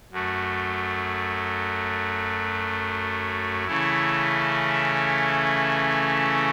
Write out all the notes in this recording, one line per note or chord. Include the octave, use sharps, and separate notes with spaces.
F#2 F#3 A3
C#3 E3 A3 C#4 E4